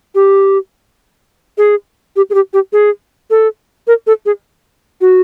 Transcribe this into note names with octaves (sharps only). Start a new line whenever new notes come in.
G4
G#4
G4
G#4
G4
G4
G#4
A4
A#4
A4
G#4
F#4